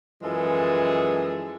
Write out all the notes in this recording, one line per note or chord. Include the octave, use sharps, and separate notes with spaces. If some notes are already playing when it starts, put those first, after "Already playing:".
F#2 E3 F3 G#3 G#4 A4